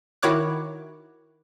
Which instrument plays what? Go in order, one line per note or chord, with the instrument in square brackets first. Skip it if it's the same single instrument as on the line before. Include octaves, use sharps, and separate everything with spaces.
[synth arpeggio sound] D#3 E4 F#4 C#5 D6 F#6